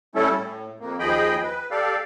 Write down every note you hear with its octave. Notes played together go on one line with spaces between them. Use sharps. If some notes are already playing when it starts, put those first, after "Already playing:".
G3 A3 C#4 E4 A4
A2
F2 A#3
D#2 F3 G#4 D#5 G5 B5
B4
G4 A4 D5 F5